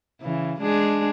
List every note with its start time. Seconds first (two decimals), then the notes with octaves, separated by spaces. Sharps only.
0.22 C#3 E3
0.61 G#3 D4 G#4